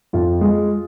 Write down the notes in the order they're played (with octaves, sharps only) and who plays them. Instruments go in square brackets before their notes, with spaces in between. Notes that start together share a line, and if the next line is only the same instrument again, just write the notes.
[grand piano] F2 [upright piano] F4
[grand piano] G#3